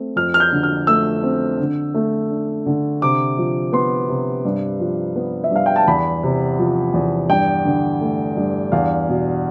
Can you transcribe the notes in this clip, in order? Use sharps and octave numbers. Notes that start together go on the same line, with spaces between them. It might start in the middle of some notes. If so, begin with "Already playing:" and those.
Already playing: A3 C4
F2 F6
F6
G6
D3
F6
A3 E6
C4
D3
A3
D4
D3
C3 D6
F3
B3 C6
C3
G2
F3
B3
E5
G2 F5
G5
A5
E2 B5
C3
F3
E2
G2 G5
D3
A3
G2
E2 F5
B2